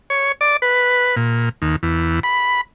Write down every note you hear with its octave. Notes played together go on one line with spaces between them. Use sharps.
C#5
D5
B4
A#2
D#2
E2
B5